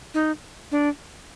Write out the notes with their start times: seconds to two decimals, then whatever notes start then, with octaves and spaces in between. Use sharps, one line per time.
0.14 D#4
0.72 D4